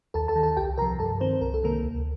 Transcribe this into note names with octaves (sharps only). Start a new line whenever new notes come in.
D#2 A4 A5
A4 A5
D#3
A4 A5
C2 G4 G5
C3 F3 A#4 A#5
G2 A4 A5
D#3 C4 C5
C2 A#4
A4
C3 D#3 A#3 A#4
D2